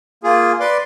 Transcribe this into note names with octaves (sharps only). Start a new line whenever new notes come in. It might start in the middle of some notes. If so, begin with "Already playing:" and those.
A#3 F4 G#4
B4 D5 C6 D6